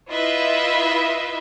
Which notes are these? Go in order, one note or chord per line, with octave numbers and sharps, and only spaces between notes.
E4 F4 B4 D#5 E5